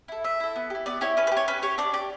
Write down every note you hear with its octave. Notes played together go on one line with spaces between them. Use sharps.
E4 A4
A3 E5
E4 A4
B3
E4 G4
B3 D5
E4 G4 C#5
C#4 B4
B4
G4
C#5
C#4 B4
G4 C#5
D4 D5
G4 D5